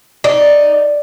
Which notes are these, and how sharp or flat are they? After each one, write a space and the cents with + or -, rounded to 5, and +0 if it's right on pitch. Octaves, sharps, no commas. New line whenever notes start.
D#4 +0 D5 +0